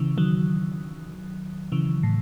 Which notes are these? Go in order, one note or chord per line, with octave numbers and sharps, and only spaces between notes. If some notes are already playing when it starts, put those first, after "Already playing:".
Already playing: C#3 E3
D#3 F#3
C#3 E3
A2